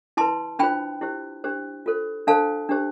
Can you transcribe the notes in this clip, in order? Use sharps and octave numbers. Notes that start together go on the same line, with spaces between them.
E4 B4 A5 C6
D4 F4 C5 G5 B5
E4 G4 C5
D4 G4 C5
F4 A4 C5
D4 A4 C5 F5 A5
D4 G4 C5